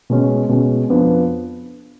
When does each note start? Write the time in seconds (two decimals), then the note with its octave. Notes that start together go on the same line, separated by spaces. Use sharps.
0.10 B2 G#3 C#4
0.49 B2 G#3 C#4
0.90 F2 F3 B3 D4